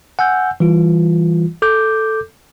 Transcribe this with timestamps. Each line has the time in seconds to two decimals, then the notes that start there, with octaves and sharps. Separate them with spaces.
0.19 F#5 G#5 E6 G6
0.60 E3 G3 F4
1.62 A4 D6 G6